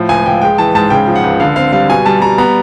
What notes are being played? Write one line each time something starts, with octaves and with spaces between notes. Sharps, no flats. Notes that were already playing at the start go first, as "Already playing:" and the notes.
Already playing: A2 F3
C#2 G#5
C#2 G5
G#3 G5
E3 A5
G#2 A5
C#3 G5
F3
F#5
C#2
D3 F5
C4 F5
G3 F5
B2 G#5
G3 A5
G3 A#5
B3 A#5